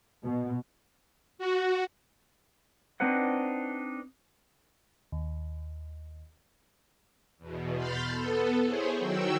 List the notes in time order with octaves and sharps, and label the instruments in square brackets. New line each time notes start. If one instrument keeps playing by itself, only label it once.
[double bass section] B2
[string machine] F#4
[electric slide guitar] C4 D4 D#4 B4 F#5
[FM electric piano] D#2
[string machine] E2 B2
B5 C6 F6 G6 A6
B3 A4
E4 G#4 C5 C#5
D#3 F#3 F#4 G5 E6